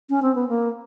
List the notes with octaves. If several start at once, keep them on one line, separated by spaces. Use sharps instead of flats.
C#4
C4
B3
A#3